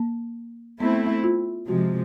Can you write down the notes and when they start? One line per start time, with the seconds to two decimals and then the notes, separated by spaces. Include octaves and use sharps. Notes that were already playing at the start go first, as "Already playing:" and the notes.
Already playing: A#3
0.80 A3 B3 C4 E4
1.24 F4
1.68 C3 F3 G#3 F#4